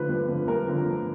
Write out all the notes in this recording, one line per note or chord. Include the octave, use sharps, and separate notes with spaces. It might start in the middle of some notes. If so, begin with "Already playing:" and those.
Already playing: D3 F3 A3 B4
G2
D3 F3 A3
G2 A#4
D3 F3 A3
G2